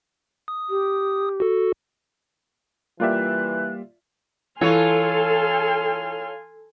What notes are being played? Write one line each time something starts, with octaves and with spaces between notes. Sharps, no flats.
D#6
G4
F#4 A4
E3 G3 A#3 F4 G4 D5 E5 F#6
E3 F4 A4 C#5 G#5 C6 F6